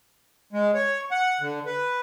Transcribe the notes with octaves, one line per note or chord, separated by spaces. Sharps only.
G#3
C#5
F#5
D3
B4